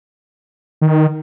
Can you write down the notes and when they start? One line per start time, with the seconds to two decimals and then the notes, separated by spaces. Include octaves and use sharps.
0.81 D#3